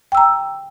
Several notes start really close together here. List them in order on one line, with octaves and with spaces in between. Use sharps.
G5 E6 A#5